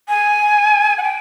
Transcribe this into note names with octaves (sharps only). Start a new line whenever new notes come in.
G#5
F#5
G5